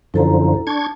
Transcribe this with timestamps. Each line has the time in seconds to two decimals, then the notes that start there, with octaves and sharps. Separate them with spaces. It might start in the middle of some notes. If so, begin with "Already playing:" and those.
0.14 F#2 D3 F3 E4 A4 A#5
0.67 D4 A5 C#6 G#6